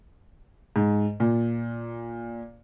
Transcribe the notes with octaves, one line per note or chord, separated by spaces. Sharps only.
G#2
A#2